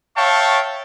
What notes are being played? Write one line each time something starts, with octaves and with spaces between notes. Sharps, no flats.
C#5 E5 F5 G5 A5 C#6